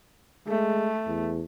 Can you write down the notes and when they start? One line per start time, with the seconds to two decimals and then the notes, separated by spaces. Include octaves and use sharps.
0.48 G#3 A3
1.07 E2